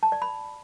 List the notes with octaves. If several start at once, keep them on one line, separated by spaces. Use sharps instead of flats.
A5
D5
B5